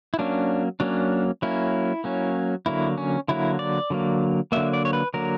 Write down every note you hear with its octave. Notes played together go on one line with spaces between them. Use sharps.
E4
F#3 A#3 C#4 D4
F#3 A#3 C#4 D4
F#3 A#3 C#4 E4
F#3 A#3 C#4
D3 F#3 A#3 E4
C#4
D3 F#3 A#3 E4
D5
D3 F#3 A#3
D3 F#3 A#3 E5
D5
C#5
B4
D3 F#3 A#3 A#4